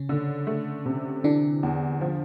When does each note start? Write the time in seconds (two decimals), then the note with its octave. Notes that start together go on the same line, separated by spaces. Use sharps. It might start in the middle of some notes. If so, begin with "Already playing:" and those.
Already playing: C#3 C#4
0.09 D3
0.47 A3
0.86 C3
1.24 D3 E3 D4
1.63 E2
2.01 F3